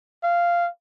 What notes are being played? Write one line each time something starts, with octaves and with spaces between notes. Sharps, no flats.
F5